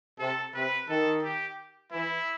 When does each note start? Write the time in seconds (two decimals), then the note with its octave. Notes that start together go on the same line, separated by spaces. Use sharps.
0.19 C3 A4
0.54 C3 B4
0.88 D#3 A4
1.23 G4
1.92 E3 E4